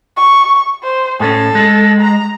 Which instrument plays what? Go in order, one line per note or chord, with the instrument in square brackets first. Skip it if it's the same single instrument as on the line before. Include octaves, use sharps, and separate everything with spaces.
[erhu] C#6
C5
[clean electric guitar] A2 C#4 [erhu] A4
[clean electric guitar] G#3
[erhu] A#5